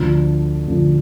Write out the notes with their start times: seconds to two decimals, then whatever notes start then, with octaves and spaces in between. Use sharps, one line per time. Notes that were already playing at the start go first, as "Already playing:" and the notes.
Already playing: D2 D3 F3
0.67 D2 D3 F3